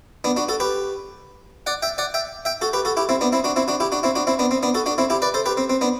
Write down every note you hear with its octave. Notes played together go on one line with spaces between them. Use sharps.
B3 D4
D4 F#4
F#4 A4
G4 B4
D5 F#5
E5 G5
D5 F#5
E5 G5
E5 G5
F#4 A4
G4 B4
F#4 A4
E4 G4
C4 E4
B3 D4
C4 E4
D4 F#4
C4 E4
D4 F#4
E4 G4
D4 F#4
C4 E4
D4 F#4
C4 E4
B3 D4
C4
B3 D4
F#4 A4
D4 F#4
C4 E4
E4 G4
B4 D5
A4 C5
G4 B4
C4
C4
B3 D4